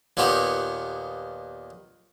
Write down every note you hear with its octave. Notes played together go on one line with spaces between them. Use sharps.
D#2 A#2 D#3 B3 G4